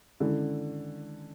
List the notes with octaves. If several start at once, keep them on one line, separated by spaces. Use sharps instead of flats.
D3 D#3 G#3 C#4 E4